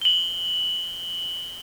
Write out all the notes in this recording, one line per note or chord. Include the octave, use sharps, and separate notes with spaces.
F#7 G7